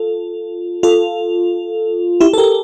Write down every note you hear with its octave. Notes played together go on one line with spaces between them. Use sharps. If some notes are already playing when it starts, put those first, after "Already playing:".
Already playing: F4 A4
F4 A4
E4 G4
A4
G4 A#4